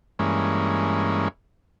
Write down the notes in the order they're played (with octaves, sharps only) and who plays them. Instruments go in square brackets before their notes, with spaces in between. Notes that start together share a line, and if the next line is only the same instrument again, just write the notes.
[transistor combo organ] G2 E3 G#3 A#3 C#4